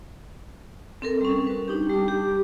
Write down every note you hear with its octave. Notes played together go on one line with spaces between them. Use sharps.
C4 A4 A#4
G3 C#4
F#4 B4
G3 D4 D#4 G4
G3 A5 D6
G4